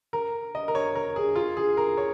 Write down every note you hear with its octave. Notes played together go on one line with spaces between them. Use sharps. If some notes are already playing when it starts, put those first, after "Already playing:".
A#4
D#5
A#4
C#5
A#4
G#4
F4
G#4
A#4
C#5